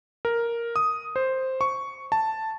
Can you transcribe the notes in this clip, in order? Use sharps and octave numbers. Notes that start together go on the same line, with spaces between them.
A#4
D#6
C5
C#6
A5